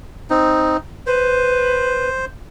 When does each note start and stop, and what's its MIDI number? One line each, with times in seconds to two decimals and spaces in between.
0.30 0.77 60
0.30 0.77 63
1.07 2.09 71
1.07 2.25 72